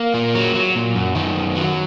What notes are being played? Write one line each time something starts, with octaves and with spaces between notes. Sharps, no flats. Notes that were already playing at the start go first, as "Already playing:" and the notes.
Already playing: A#3
A#2
F#3
F#3
A#2
F#2
D#3
F#2
F#3